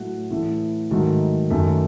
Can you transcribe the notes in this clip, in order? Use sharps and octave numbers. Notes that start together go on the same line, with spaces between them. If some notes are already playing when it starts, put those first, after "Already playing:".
Already playing: A2 F#3 A3 F#5
A2 E3 A3
G#2 D#3 F#3 A3
F#2 D#3 A3